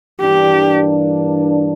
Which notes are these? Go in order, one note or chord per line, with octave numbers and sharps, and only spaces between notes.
G2 E3 A#3 D4 G4